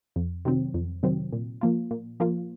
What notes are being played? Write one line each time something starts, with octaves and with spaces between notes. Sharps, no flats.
F2
C3 D#3 F#3 C4
F2
C3 D#3 F#3 C4
A#2
F3 A#3 F4
A#2
F3 A#3 F4